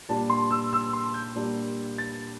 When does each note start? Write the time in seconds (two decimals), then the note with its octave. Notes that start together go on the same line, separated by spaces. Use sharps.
0.09 A#2 G3 D4 A5
0.30 C6
0.51 E6
0.73 E6
0.93 C6
1.14 G6
1.35 A#2 G3 A#3 D4
1.98 A6